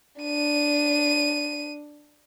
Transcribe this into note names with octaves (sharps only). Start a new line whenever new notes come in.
D4 D#7